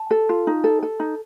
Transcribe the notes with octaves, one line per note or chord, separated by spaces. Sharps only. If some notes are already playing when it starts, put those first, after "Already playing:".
Already playing: A5
A4
F4
D#4
A4
A4
D#4